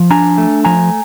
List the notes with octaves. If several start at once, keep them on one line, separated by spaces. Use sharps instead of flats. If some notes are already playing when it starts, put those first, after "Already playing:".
Already playing: F3
D4 G#5 A#5
A3
F3 G#5 A#5